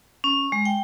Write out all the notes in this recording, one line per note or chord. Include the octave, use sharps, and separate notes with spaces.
C#4
G#3
G5